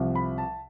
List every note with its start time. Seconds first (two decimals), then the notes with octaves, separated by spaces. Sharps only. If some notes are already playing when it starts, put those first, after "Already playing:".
Already playing: C2 C3 F3
0.15 B5
0.38 A5